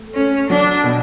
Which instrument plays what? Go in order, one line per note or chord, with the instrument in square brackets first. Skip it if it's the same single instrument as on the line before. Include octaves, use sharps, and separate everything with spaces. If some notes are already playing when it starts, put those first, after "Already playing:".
Already playing: [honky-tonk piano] A3
[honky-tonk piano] A3 [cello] C#4
[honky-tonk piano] F#3 [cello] D4
[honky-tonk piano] B2